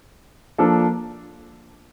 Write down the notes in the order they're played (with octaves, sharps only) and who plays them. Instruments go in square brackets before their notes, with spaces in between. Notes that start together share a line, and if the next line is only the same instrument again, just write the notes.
[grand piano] F3 A#3 D4 A4